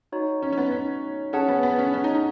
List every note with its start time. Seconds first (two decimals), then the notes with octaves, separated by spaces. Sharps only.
0.12 D#4 F#4 C#5
0.42 C#4
0.52 C#4
0.58 B3
0.72 C#4
1.33 C#4 G#4 C#5 F#5 A5
1.48 B3
1.63 B3
1.79 C#4
1.94 C#4
2.04 D#4
2.14 D#4